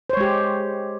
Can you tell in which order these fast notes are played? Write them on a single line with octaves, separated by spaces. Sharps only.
C5 C#5 G#3 G4